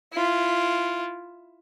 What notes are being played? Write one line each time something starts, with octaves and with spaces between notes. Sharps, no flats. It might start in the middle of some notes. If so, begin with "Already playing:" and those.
E4 F4